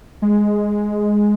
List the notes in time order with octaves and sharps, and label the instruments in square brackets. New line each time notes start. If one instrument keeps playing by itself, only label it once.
[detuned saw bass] G#3